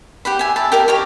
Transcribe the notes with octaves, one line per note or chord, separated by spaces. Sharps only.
G4 F#5 B5
E5 G#5
E5 A5 B5
G4 A#4 D#5 E5
G4 A#4 C#5 D#5